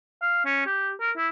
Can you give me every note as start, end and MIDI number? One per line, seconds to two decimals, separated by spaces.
0.21 0.43 77
0.45 0.65 61
0.66 0.91 67
1.00 1.11 70
1.17 1.28 64